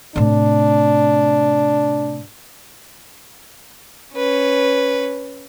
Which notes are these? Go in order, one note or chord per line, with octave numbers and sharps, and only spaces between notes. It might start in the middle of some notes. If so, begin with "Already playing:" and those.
A2 C3 D4
C#4 B4